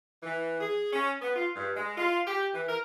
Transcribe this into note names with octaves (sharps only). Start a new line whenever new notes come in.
E3
G#4
C#4
B3
F4
G2
G#3
F4
G4
E3
A#4